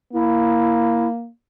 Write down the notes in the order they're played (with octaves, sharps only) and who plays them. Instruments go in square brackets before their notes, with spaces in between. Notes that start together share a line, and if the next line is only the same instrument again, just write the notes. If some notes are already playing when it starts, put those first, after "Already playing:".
[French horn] A#3 [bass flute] E4